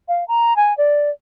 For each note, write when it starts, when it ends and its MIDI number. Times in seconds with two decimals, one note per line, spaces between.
0.08 0.26 77
0.28 0.56 82
0.56 0.76 80
0.77 1.10 74